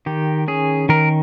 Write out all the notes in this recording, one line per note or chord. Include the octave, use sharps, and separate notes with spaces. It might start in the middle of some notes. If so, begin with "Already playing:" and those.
D#3 G4
C#4 G#4
D#3 A#4